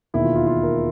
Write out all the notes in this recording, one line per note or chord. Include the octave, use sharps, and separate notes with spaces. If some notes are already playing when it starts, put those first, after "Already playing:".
E1 D#2 D#3 E4
F4
F4
F4
A#4